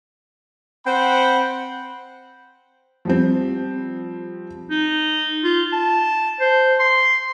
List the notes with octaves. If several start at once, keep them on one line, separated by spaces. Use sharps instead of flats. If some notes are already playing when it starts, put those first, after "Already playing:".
C4 C5 F#5 G5 B5
F3 G3 C4
D#4
F4
A5
C5
C6